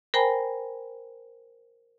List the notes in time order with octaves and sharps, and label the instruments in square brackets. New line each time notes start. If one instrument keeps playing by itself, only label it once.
[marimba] A#4 C5 G5 G#5 A#5 B5